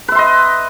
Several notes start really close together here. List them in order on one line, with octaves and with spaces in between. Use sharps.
B4 E5 C6 D#5